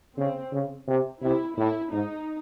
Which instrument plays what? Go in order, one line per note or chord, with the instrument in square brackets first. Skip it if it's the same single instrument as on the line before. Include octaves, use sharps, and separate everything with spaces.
[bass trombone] C#3 [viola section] C4
[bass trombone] C#3
C3
[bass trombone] C3 [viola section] E4
[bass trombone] A2 [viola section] E4
[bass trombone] G#2 [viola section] D#4